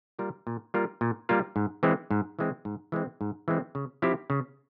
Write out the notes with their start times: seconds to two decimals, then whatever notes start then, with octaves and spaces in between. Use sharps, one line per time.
0.19 G3 A#3 F4 A#4
0.47 A#2
0.74 G3 A#3 F4 A#4
1.01 A#2
1.29 G3 A#3 F4 A#4
1.56 G#2
1.83 E3 G#3 C4
2.11 G#2
2.39 E3 G#3 C4
2.65 G#2
2.92 E3 G#3 C4
3.21 G#2
3.48 E3 G#3 C4
3.75 C#3
4.02 F3 C4 E4 G4
4.30 C#3